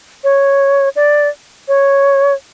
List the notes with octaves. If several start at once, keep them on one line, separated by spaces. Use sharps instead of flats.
C#5
D5
C#5